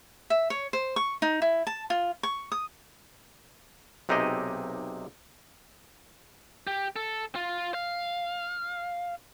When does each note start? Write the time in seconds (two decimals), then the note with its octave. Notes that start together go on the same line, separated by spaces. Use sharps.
0.30 E5
0.50 C#5
0.73 C5
0.96 C#6
1.22 D#4
1.42 E4
1.67 A5
1.90 F4
2.23 C#6
2.52 D#6
4.09 B1 C3 D#4 G4 G#4 D#5
6.67 G4
6.96 A4
7.35 F4
7.74 F5